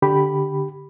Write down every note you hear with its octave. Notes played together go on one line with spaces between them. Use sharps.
D3 G4 B5